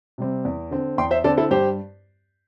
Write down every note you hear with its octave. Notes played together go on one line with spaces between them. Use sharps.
C3 G3 C4
E2
D3 C4
E2 G5 C6
C5 E5
D3 C4 A4 D5
E4 A4
G2 G4 C5